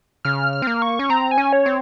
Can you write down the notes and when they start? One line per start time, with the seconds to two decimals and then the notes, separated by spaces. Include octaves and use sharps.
0.25 C#3 F6
0.53 F6
0.62 C4
0.67 A#3
0.82 C#6
0.99 C#4
1.10 C4 A#5
1.31 G#5
1.38 C#4
1.53 C#5
1.66 C4